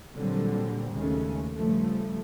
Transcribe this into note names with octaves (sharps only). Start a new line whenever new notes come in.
A#2 D3 F#3 G3 C4
D#2 C#3 G#3 A3 C#4
G2 C#3 F3 A3